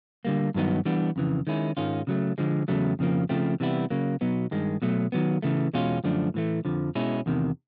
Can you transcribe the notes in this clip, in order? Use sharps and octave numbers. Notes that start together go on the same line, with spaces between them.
D3 G3 A#3
G2 D#3 F#3 B3 D#4
E3 G3 B3 D4
F2 C#3 E3
D#3 G#3 C#4 E4
G#2 D#3 G#3 C#4 F4
C#3 F#3 A3
D3 F3 G#3
E2 C#3 F#3 A3
F2 C#3 F3 A#3
C#3 F3 A3 C4
C3 E3 G3 B3 E4
C#3 F#3 A#3
B2 F#3 B3 D#4
G2 D#3 G#3
B2 F#3 A3
D#3 F#3 B3
C#3 E3 A3
E2 B2 G#3 C#4 F4
F#2 D3 F3 A3 D4
A2 E3 A3
F2 D3 F3
B2 G#3 C#4 E4
E2 C3 D#3